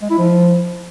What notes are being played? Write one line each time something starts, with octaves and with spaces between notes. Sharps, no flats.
G#3
E4
F3